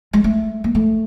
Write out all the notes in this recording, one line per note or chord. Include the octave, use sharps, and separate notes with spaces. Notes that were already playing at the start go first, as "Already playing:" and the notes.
G#3
A3
A#3
A3